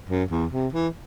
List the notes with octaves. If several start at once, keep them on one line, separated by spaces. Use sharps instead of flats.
F#2
E2
C3
E3